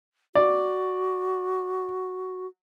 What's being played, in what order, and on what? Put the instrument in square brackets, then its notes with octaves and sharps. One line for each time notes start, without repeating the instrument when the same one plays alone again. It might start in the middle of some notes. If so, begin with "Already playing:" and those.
[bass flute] F#4 [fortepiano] D5